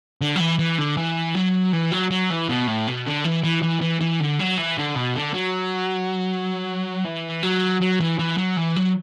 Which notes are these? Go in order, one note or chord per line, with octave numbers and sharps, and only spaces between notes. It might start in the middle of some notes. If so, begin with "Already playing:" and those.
D3
F#3
E3
E3
D3
E3
F#3
E3
F#3
F#3
E3
B2
A2
B2
D3
E3
E3
E3
E3
E3
D3
F#3
E3
D3
B2
D3
F#3
E3
F#3
F#3
E3
E3
F#3
E3
F#3